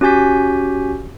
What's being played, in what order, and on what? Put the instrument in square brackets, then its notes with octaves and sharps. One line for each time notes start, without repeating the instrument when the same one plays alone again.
[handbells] C#4 F#4 G4 G#5 G6 B6